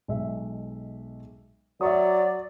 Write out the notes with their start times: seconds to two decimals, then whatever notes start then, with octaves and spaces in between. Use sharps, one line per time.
0.08 B1 G#3 E5
1.81 F#3 D5 E5 C#6 D#6